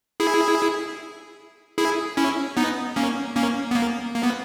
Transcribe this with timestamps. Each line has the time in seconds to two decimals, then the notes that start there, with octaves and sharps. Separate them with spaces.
0.20 E4 G#4
1.78 E4 G#4
2.17 C#4 E4
2.57 B3 D#4
2.96 A#3 C#4
3.36 A#3 C#4
3.71 B3
3.75 A#3
4.15 A#3
4.23 B3